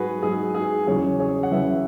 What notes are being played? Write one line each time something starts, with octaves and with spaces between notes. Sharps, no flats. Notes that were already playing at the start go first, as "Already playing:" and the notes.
Already playing: G#2 F#3 F#4 G#4 B4
G#2 F#3 G#4
G#4
E2 C#3 F#3 G#4 C#5
G#4 C#5
F#5
E2 C#3 F#3 B4 E5